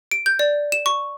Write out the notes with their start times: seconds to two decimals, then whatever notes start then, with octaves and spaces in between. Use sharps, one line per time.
0.11 D7
0.26 G6
0.39 D5
0.72 E7
0.86 C#6